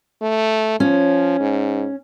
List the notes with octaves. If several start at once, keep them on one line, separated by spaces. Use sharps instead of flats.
A3
F3 C#4
G#2